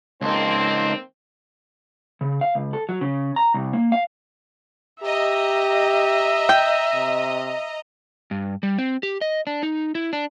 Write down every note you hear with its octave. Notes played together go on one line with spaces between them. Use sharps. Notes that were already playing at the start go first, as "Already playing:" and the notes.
C#2 A#3 C4 D#4 A5 C6
C#3
F5
C#2
A4
F#3
C#3
A#5
C2
A#3
F5
G4 D#5 E5 A#5
G5
C3
G2
G3
C4
G4
D#5
D4
D#4
E4
D4